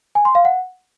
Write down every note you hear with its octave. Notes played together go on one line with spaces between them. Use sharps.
G#5
C6
F5
F#5